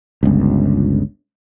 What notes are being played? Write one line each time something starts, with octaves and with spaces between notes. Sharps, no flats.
G1 C#2